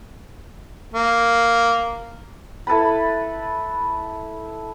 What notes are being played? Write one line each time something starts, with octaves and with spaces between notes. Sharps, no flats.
A#3
E4 A4 B4 B5